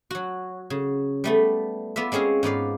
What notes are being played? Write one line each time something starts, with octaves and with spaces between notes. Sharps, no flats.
F#3 F#4
C#3
G3 A3 B3
B3 F4 D5 E5
G#3 C4 C#4 G#4 F5
G#2 B3 D5 F5